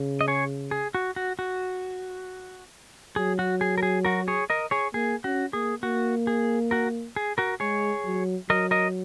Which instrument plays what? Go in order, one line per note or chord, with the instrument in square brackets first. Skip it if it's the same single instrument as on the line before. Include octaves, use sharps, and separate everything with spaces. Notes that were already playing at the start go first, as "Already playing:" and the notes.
Already playing: [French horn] C#3
[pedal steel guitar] D#5
G#4 C#5
G#4
F#4
F#4
F#4
[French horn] F#3 [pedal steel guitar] G#4
[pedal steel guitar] F#4
G#4
A#4
G#4
F#4 A#4
G#4 C#5
A#4 D#5
G#4 C#5
[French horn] A#3 [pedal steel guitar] G#4
[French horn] C#4 [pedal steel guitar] F#4
[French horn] A#3 [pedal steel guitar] G#4
[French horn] A#3 [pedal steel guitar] F#4
[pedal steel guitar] G#4
F#4 A#4
G#4
F#4 A#4
[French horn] G#3 [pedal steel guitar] G#4 C#5
[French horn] F#3
[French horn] F#3 [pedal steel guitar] A#4 D#5
[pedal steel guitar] A#4 D#5